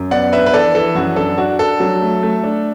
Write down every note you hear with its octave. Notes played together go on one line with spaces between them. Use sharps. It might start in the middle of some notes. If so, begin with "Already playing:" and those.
Already playing: F#2
B3 D5 F#5
D4 B4 E5
B4
E3 A4 D5
E3 A4
F#2 F#4
D4 A4
D4 F#4
D4 A4
F#3
A3
A3
D4